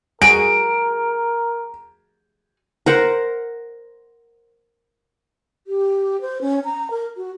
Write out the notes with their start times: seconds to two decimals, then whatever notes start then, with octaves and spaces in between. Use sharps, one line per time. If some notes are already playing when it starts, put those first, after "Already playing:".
0.22 F#4 G#4 A#4 D7
2.86 A#4 C5 F#5
5.67 G4
6.21 C5
6.41 C#4
6.65 A#5
6.91 A#4
7.17 F#4